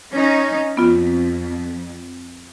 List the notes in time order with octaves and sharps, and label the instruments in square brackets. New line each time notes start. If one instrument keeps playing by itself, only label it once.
[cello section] C#4 D#4
[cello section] F2 [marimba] B3 F4